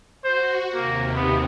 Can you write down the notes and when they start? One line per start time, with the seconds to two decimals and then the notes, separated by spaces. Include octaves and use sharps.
0.24 F#4 C5
0.74 D#2 C3 A#3
1.16 B3